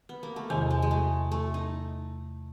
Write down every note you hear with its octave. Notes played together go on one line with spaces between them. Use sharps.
B3
A#3
A3
E2 C3 D#3 G#3
G#3
G#3
A3
A3
D#4